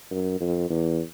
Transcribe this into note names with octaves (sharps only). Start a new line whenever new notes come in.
F#2
F2
E2